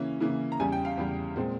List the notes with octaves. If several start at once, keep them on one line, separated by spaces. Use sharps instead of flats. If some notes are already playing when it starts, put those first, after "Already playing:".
Already playing: C#3 E3 A#3 C#4
C#3 E3 A#3 C#4
A#5
E2 C#3 G3 G#5
G5
F5
E2 C#3 G3
A#2 G#3 C4